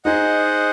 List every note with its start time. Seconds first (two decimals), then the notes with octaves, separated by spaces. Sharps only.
0.05 D#4 G#4 C5 D#5 F#5